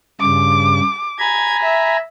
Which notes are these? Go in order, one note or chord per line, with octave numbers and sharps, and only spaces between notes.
G2 C#3 D6
G#5 A#5 B5 G#6
E5